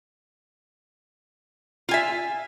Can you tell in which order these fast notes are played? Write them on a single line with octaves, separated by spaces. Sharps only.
F4 G#5 E5